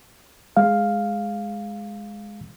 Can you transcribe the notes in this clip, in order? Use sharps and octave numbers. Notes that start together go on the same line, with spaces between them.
G#3 F5